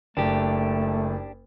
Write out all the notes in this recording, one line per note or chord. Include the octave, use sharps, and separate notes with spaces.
F#1 A3 D4 G4